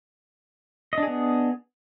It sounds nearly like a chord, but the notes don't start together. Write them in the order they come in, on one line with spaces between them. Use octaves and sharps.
D#5 D4 G#4 B3